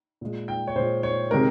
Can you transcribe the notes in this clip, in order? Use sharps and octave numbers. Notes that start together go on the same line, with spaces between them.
A#2 G#3
G5
C#5
A#2 G#3 C5
C#5
C3 D#3 G#3 A#4